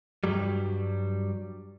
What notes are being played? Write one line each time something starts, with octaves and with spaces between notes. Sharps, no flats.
G2 F#3 G3